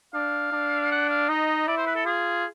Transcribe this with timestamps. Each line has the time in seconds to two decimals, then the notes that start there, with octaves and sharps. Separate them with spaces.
0.14 D4 F5
0.52 D4
0.91 F#5
1.09 F5
1.29 D#4 D#5
1.67 E4 D5
1.77 C5
1.87 B4
1.96 A4
2.05 F4 G#4